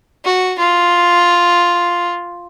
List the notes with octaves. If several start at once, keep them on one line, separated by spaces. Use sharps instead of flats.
F#4
F4